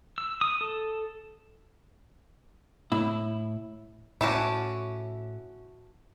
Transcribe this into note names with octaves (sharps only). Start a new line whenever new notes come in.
E6
D#6
A4
A2 E4
A2 C#4 E4 F#4 A5 D6